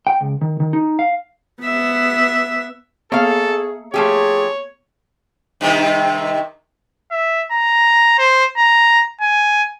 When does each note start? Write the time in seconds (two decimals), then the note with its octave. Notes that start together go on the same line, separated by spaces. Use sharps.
0.07 G5
0.21 C#2
0.41 D#3
0.60 D#3
0.73 D#4
0.99 F5
1.62 B3 E5
3.12 A#3 B3 G#4 A4 C#5 F5
3.94 F3 A3 G4 G#4 C#5
5.61 G2 C3 D#3
7.11 E5
7.52 A#5
8.18 C5
8.58 A#5
9.21 G#5